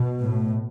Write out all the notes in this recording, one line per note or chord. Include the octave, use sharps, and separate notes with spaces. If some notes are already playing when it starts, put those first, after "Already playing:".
Already playing: B2
A2